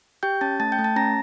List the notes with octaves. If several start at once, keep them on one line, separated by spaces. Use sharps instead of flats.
G4 G5 G6
C#4 A5 A6
A3 A5 A6
G5 G6
A3
A5 A6
C#4 A#5 A#6